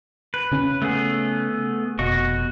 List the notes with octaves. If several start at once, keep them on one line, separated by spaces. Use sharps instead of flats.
B4
C#3 C#4
A3 B3 G#4
F1 B2 F#4 D#5 C#6